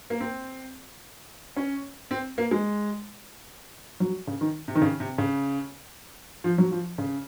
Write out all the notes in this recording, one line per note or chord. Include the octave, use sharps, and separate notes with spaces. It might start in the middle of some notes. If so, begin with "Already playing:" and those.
A#3
C4
C#4
C4
A#3
G#3
F#3
C#3
D#3
C3
D#3
C#3
C3
C#3
F3
F#3
F3
C#3